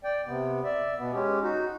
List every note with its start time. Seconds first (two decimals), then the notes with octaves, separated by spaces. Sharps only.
0.04 D5 G5
0.26 C3 B3
0.64 D5 E5
0.98 B2 B3
1.12 G#3 C#4 G4
1.42 D#4 F#4